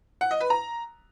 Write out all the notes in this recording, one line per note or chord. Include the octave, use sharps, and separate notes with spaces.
F#5
D#5
B4
A#5